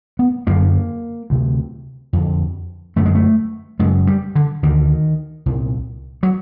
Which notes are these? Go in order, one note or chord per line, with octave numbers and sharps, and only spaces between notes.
B3
F#2 D3 A#3
D2 C3
F2 D3
F#2 D3 A3
G#3
A3
F#2 C#3 G#3
G3
D3
D2 D3 D#3
C2 A#2
F#3